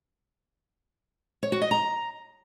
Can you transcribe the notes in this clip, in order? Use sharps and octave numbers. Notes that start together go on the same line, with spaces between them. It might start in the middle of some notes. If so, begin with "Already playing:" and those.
C#5
F#4
D#5
A#5